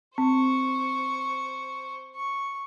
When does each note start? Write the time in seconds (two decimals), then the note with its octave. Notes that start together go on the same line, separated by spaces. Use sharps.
0.18 C4 C5 C#6
2.15 C#6